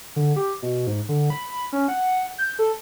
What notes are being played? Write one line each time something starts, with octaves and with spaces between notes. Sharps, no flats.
D3
G4
B2
G#2
D3
B5
C#4
F#5
G6
A4